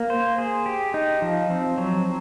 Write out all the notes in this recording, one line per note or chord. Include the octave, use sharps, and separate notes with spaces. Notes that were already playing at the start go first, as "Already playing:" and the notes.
Already playing: A#3
C5
G#4
G4
D#4
F3
C4
F#3